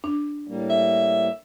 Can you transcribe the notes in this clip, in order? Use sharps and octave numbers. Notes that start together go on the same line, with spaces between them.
D4
A2 G3 A#3
E5